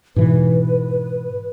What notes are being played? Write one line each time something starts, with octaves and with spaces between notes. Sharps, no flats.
G#2 B2 E3 B4